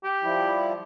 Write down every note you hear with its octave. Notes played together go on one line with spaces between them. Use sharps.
G4
F3 G3 E4